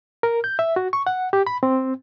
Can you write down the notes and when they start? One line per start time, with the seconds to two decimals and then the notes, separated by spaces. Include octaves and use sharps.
0.23 A#4
0.44 G6
0.59 E5
0.76 F#4
0.93 C#6
1.07 F#5
1.33 G4
1.47 B5
1.63 C4